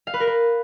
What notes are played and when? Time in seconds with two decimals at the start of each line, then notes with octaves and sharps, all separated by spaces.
0.07 F5
0.14 B4
0.20 A#4
0.27 B4